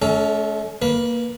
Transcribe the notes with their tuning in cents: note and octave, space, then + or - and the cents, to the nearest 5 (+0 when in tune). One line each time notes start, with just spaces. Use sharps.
A3 -45 C#4 +25 A4 +0
A#3 +0 B4 -20